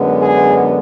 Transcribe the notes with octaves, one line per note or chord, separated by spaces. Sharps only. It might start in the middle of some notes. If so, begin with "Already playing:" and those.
Already playing: F#2 D3 G#3 B3
G#4